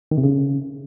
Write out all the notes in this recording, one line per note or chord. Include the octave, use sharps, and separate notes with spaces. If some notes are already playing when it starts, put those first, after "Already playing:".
D#3
C3
C#3